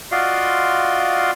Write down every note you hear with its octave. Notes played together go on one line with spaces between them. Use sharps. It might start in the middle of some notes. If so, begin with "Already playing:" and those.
F4 F#4 D5 D#5 F5 C6